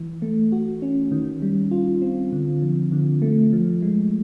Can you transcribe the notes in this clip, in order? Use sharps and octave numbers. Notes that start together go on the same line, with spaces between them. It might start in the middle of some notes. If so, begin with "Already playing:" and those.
Already playing: E3
A3
F#4
C#4
D#3
G3
F4
C4
D3
F3
D3
A3
F3
G#3